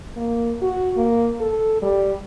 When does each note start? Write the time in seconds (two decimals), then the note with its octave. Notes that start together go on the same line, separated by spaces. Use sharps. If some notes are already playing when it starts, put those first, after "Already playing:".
0.17 A#3
0.62 F#4
0.97 A#3
1.40 A4
1.82 G3